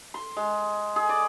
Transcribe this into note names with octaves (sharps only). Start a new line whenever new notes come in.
C6
G#3
G#4
D5